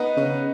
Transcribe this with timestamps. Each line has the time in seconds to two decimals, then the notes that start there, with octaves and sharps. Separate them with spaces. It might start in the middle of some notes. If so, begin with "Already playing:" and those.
Already playing: B3 D#4
0.17 C#3